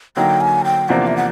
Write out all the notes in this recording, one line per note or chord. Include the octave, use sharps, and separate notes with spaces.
D3 F#3 A#3 D#4 G5
G#5
G5
E2 C3 F3 A#3 D4 F#5
E5
F#5